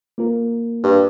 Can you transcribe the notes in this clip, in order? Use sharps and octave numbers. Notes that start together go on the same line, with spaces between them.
A#3 F4 A#4
G2